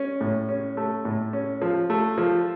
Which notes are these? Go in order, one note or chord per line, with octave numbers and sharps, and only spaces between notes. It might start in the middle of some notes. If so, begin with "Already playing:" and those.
Already playing: C#4
A2
C#4
A3
A2
C#4
F3
A3
F3